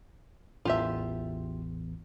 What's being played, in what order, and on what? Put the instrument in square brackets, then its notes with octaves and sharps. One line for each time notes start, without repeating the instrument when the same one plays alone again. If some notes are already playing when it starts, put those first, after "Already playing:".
[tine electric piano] A1 E2 [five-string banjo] F4 G4 E5